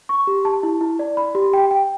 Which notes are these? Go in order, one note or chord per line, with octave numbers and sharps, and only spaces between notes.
C#6
G4
A5
E4
E4
D5
B5
G4
G5
G5